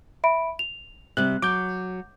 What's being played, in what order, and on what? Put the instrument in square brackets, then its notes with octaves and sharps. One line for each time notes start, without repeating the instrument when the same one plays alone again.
[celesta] E5 B5 D7
F7
[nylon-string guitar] C3 G3 [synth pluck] F#6
[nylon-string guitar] F#3 [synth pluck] D6 G6